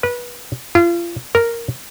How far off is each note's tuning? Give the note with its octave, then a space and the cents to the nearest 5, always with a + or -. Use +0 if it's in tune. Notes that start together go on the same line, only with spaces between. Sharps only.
B4 -25
F4 -35
A#4 +0